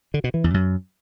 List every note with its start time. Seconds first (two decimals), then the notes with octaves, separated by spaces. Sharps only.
0.14 D3
0.24 B2
0.34 E3
0.44 E2
0.54 F#2